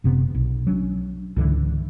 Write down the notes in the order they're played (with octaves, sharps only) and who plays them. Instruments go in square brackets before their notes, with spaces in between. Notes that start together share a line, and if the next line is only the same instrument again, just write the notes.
[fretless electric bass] F#1 C3 B3
B1
F#3 C#4 D4
C#2 G#2 D3 E3